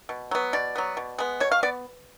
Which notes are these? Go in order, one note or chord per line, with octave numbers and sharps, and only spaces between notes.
B2
F#3 B3
B2 D5
F#3 B3
B2
G#3 B3
B2 C#5
F5
B3 D5